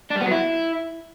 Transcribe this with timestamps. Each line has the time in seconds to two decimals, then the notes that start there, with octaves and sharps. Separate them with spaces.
0.11 D4
0.16 G3
0.21 B3
0.26 F#3
0.31 E4